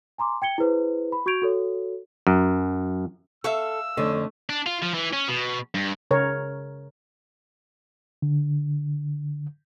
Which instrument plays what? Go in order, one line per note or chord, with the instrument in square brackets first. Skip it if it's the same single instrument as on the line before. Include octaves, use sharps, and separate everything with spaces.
[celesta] G#5 A#5 C6 D6
G5 G#6 C#7 G7
E4 G#4 B4 C5
B5
F#4 C#6 G6 G#6 D7 F7
F#4 A4 C#5
[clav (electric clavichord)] F#2
[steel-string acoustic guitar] A4 [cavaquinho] E5 F5 C#6 [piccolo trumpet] E6
[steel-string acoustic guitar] F2 D3 C#4 [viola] A3
[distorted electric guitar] D4
F4
F3
E3
C#4
B2
G2
[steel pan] C#3 A#4 C#5
[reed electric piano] D3